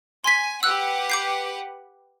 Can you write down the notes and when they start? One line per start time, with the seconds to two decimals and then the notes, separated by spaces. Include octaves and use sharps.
0.24 G#5 C6 B6
0.63 G4 B4 F#5 E6 F#6
1.10 D6 G6 C7